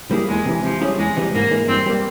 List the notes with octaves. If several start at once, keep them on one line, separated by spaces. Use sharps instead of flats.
G3 A#3 E4 G#4
E2 G#3
C3 E3
C3 F3
G3 C#4 E4 G#4
E2 G#3
C3 E3 G3
G#2 A#3
E3 G#3
G2 C4
G3 A#3